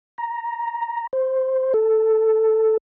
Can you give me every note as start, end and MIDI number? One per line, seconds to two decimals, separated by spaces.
0.18 1.07 82
1.13 1.73 72
1.74 2.77 69